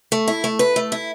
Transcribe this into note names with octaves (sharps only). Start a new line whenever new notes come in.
A3
E4
A3
B4
A3
E4